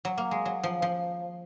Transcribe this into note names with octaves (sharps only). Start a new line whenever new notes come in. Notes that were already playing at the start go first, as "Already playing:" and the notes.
F#3
A#3
G#3
F#3
F3
F3